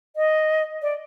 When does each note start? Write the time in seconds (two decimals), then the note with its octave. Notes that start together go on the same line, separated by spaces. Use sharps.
0.16 D#5
0.82 D5